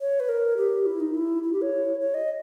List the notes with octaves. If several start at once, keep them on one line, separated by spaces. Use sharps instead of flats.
C#5
B4
A#4
G4
E4
D#4
E4
E4
G4
C#5
C#5
D#5